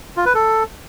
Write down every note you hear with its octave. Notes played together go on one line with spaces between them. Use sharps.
F4
B4
A4